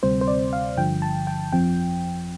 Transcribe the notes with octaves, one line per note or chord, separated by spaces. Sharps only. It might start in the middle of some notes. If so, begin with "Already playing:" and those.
D2 C3 G3 C4 C5
C5
D5
F5
G1 G2 D3 F3 G5
A5
G5
G1 F2 F3 C4 G5